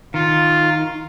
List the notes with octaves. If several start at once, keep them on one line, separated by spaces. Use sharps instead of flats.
D#3 F4